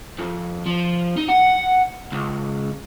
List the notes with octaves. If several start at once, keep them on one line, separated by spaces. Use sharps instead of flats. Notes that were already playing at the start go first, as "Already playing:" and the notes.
F2
F3
D#4
F#5
C#2